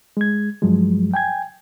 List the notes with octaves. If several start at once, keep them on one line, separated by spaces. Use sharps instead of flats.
G#3 G#6
G2 F3 F#3 G#3
G5 G#5 G#6